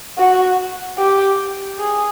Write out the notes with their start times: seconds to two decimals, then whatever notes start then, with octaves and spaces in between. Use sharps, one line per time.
0.18 F#4
0.98 G4
1.78 G#4